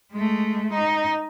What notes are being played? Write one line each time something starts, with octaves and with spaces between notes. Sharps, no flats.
G#3 A3
D#4